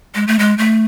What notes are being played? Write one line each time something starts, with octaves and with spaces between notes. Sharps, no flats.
G#3
A3
G#3
A3